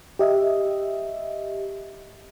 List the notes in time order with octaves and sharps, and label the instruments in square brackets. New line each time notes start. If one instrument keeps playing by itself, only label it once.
[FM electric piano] G4 D#5 E5